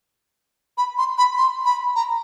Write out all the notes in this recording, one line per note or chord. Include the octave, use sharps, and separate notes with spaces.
B5
C6
B5
C6
B5
A#5